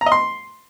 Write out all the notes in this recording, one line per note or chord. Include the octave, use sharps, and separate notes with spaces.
A#5
D#5
C6